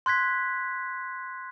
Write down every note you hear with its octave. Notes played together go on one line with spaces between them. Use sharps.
C6 F#6 G#6 B6